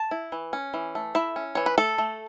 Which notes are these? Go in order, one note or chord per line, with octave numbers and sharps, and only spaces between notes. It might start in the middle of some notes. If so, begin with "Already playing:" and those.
Already playing: A5
E4
E3
C#4
E3
A3
E4 E5
C#4
E3 C#5
B4
A3 A4
A3